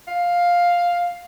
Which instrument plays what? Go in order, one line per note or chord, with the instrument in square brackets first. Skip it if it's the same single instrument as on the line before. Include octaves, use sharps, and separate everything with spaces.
[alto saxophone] F5